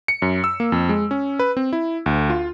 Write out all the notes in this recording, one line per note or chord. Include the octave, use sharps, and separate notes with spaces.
C#7
F#2
E6
A#3
F2
G#3
C#4
B4
C4
E4
D2
F4